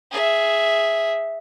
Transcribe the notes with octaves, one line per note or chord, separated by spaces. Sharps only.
G#4 E5